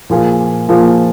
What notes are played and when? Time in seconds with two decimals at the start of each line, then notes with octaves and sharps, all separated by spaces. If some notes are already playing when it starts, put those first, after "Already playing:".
0.10 A#2 F3 A#3 F4 G#4
0.69 A#2 F3 A#3 F4 G#4